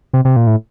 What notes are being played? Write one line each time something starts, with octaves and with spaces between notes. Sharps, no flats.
C3
C3
A#2
A2